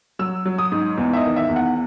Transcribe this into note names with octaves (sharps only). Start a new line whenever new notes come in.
F#3 E6
F#3
D#6
G#2
E2
E5
D#5
D#3
E5
E2
F#5